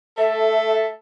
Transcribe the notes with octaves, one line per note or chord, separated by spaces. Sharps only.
A3 A4 E5